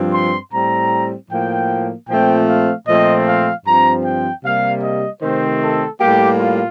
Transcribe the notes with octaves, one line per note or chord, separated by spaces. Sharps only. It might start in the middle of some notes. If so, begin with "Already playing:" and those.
Already playing: G2 F3 C4
C6
A2 G3 C4 A#5
A2 F3 A#3 G5
A#2 F3 A3 C4 G5
F5
A#2 F3 A3 C4 D#5
F5
G2 F3 C4 A#5
G5
C3 G3 A#3 F5
D#5
C3 D#3 A3 C4 C5
A4
A2 G3 A#3 G4
F4